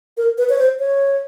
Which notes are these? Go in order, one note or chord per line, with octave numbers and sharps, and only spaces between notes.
A#4
B4
C#5
C5
C#5